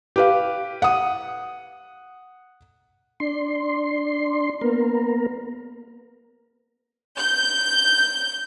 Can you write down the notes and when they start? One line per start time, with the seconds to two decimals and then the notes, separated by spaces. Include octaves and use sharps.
0.16 G4 B4 F5
0.82 F#5 D#6
3.20 D4 C6
4.61 A#3 B3 A#4
7.17 G6